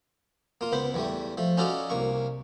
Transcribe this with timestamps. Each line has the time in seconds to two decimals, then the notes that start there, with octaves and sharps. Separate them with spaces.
0.61 A#3 F4
0.72 C#2 B3 C5 B5
0.94 E2 G3 A3
1.37 F3 A3
1.57 C#4 D#4 F4 F#4 A4 D5
1.90 C2 A#3 C#6